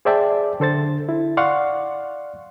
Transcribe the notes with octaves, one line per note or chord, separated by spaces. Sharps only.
G#4 C5 D5 E5 G5 A5
D3 A4 C5 A6
E4
D5 F5 F#5 C6 C#6